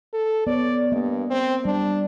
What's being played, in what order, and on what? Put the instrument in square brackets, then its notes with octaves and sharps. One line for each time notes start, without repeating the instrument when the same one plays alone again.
[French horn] A4
[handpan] B3 C#5 [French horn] D5
[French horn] G2 [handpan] A#3 D#5
[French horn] C4
[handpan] G3 [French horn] D4